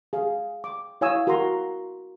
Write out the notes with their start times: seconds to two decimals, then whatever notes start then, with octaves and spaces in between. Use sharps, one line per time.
0.13 G#4 F5
0.64 D6
1.01 E4 C#5 F5 G#5 D#6 E6
1.27 F#4 A#4 F#5 A#5 C6